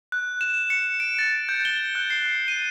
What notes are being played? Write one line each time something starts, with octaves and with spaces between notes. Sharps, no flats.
F#6
E7
C#7
D7
A6
G6
G7
F#6
C7
D#7